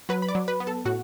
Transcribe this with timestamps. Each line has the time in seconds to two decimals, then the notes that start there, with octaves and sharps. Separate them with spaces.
0.09 F#3 B4
0.22 B5
0.28 D5 D6
0.35 F#3
0.48 B4 B5
0.60 B3
0.67 A4 A5
0.85 A2 F#4 F#5